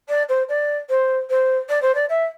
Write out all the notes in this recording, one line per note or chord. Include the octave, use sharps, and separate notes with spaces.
D5
C5
D5
C5
C5
D5
C5
D5
E5